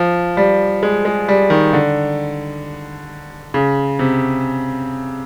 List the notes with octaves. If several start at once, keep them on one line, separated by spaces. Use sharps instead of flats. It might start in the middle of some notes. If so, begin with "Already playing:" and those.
Already playing: F3
G3
G#3
G#3
G3
D#3
D3
C#3
C3